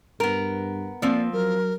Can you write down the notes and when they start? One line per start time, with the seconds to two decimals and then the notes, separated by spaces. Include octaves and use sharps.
0.20 G2 B3 A#4
1.02 F3 A#3 C4 D5
1.33 F#3 A#4